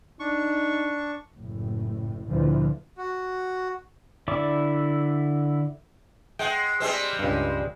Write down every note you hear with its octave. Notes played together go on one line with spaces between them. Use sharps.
D4 D#4 C#6
F#1 A2
D2 A#2 D3 E3 F3
F#4
D3 E4 D5 E5 D6
G#3 F#5 G5
G3 G#3 C4
C#2 G2